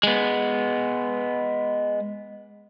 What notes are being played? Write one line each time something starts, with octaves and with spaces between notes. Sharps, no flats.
G#3 B3